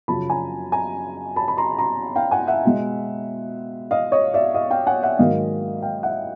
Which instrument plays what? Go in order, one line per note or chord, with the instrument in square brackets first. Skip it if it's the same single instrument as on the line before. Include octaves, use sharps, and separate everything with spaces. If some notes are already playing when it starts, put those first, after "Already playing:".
[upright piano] F#2 C#3 F3 A5 B5
G#5 A#5
G#5 A#5
A5 B5
B5
A#5 C6
A#5 C6
F5 G5
F#5 G#5
E5 F#5
B2 G#3
D#5 F5
C#5 D#5
D5 E5
D#5 F5
F5 G5
F#5 G#5
E5 F#5
G#2 D#3 F#3 A#3 D#5 F5
F5 G5
E5 F#5